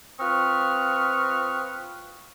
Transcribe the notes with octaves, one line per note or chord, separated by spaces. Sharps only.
C4 F4 B4 C#6 D#6 F6